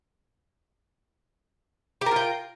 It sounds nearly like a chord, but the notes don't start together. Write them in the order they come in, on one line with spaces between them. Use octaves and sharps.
G4 A#4 F4 G5